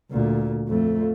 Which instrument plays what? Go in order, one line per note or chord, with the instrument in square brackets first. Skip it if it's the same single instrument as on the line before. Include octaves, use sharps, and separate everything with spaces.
[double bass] D2 A#2
F2 A3